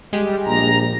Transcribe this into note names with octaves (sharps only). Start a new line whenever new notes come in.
G3 G#3 G4
A#1 A#5